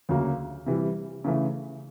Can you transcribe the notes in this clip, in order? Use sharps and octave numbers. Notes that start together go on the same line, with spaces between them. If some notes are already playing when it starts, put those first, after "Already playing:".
D2 C#3 F#3 A#3
C3 E3 G3
C#3 E3 A3